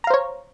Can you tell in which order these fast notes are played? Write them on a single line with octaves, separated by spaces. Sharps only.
A#5 F5 C5 C#5